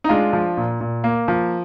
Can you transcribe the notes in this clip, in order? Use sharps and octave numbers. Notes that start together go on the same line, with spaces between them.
D#4
G#3 D4 F4
F3
A#2
A#2
A#3
F3